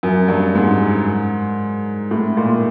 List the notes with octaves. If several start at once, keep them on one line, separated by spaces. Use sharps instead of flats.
F#2
G2
G#2
A2
A#2